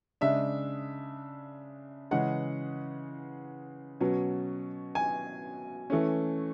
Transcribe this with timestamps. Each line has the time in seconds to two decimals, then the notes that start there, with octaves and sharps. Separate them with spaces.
0.21 C#3 G#3 D4 E5
2.11 C#3 E3 G#3 C#4 F#5
4.01 B2 F#3 C#4
4.95 G#5
5.90 E3 A3 C#4